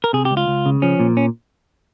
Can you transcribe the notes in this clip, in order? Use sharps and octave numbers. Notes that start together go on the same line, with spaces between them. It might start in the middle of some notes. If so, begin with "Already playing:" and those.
A#4
C3 G#4
G4
C#2
F4
C#2
C#3
F3 C#4
A#2
C#4